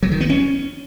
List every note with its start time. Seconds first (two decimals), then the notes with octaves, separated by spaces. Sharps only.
0.03 F#3
0.12 D#3
0.21 B3
0.30 C#4